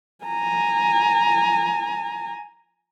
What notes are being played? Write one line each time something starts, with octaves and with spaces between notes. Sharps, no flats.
G#5 A#5